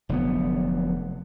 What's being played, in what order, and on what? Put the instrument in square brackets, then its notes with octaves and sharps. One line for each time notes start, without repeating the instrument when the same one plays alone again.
[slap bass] F1 D3 F#3 B3